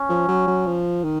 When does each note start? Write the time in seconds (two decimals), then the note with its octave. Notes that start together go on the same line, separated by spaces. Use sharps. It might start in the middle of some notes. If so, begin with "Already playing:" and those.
Already playing: C#4
0.09 F3
0.28 F#3
0.47 F#3
0.66 F3
1.04 D#3